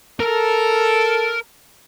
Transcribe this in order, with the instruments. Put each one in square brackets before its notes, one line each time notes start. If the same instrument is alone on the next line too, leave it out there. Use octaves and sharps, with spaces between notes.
[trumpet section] A4 [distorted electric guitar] A#4